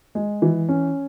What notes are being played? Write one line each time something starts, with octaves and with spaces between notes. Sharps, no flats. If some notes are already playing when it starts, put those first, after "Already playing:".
G#3
E3
C#4